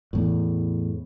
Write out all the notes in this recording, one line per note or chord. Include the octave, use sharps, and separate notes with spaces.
E2 A2